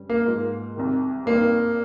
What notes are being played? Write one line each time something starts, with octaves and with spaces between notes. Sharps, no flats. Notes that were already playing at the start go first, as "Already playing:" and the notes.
Already playing: G2 G3 C#4
A#3
G#2 F3 A#3 D#4
C2 C3 D#3
G2 G3 A#3 C4 D#4